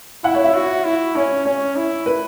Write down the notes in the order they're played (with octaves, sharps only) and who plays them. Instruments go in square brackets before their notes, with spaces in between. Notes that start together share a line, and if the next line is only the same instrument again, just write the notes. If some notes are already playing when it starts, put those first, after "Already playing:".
[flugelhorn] E4 [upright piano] F#5
[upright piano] C#5
E5
[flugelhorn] F#4
E4
[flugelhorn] C#4 [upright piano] C#5
[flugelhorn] C#4 [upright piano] C#5
[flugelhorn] E4
[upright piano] B4